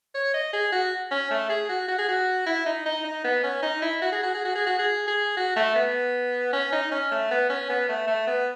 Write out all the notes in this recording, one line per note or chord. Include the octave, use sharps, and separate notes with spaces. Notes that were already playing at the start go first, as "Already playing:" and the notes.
C#5
D#5
G#4
F#4
C#4
A3
G#4
F#4
F#4
G#4
F#4
E4
D#4
D#4
D#4
B3
C#4
D#4
E4
F#4
G#4
F#4
G#4
F#4
G#4
F#4
G#4
G#4
F#4
A3
B3
C#4
D#4
C#4
A3
B3
C#4
B3
A3
A3
B3